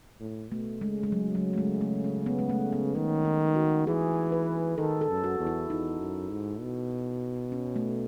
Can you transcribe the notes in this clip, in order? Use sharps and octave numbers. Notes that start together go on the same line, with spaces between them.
A2
B2 A3
C#3 G#3
G#3
F#3
F#3
A3
G#3
A3
C#4
B3
G#3
A3
B3
D#3 C#4
D#4
F#4
E3 G#4
B4
D#3 A4
A4
F#2
F#4
E2
E4
E2 D#4
F#2
G#2
B2
C#4
A3